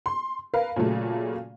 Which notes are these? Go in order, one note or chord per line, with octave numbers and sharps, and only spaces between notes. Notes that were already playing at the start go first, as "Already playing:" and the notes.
C6
A#4 B4 F5
A#2 C#3 F#3 A3